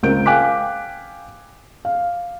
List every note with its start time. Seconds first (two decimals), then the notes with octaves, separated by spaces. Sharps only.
0.03 C#2 C4 A#4 G6 D7
0.26 F5 G5 G#5 D6 F#6 B6
1.85 F5